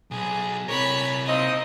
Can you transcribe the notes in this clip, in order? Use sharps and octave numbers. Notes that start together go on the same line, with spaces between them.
B1 G#4
C3 A#4 C#5 B5
A#3 C4 D#4 D#5